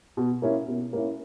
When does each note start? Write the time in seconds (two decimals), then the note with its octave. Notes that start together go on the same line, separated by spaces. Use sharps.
0.17 B2
0.42 A#3 C#4 E4
0.68 B2
0.93 A#3 C#4 E4